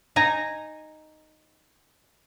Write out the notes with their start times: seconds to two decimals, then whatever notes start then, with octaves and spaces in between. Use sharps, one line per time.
0.16 D#4 G#5 A#5